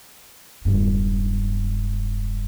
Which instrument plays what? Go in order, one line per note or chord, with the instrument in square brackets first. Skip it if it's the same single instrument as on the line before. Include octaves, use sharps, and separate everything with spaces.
[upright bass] E1 G2